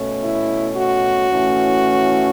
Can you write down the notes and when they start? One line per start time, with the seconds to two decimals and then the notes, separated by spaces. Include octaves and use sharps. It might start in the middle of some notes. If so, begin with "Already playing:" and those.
Already playing: B2 A3 C#4
0.23 E4
0.76 F#4
1.29 A2 E3 A3 C#4